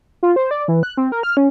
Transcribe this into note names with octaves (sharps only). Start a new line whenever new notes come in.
F4
C5
D5
E3
F#6
C4
A#4
F6
C#4